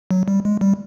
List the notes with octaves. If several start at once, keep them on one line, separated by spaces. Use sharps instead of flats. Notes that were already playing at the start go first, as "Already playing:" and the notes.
F#3
G3
G#3
G3